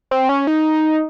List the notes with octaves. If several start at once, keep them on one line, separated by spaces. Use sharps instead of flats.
C4
C#4
D#4